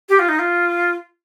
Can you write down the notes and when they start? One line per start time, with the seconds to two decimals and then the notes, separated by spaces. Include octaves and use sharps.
0.09 G4
0.19 F4
0.29 D#4
0.39 F4